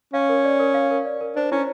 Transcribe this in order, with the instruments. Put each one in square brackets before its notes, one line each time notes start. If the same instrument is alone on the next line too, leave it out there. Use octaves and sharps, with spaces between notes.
[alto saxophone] C#4 [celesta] F5
[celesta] A#4
D5
A#4
F5
A#4
D5
A#4
[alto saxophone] D4 [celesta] C5
[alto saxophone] C#4 [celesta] E4